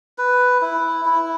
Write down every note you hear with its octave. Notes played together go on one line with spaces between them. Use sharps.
B4
E4
E4